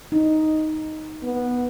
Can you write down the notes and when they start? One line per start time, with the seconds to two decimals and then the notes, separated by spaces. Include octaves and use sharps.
0.12 D#4
1.23 B3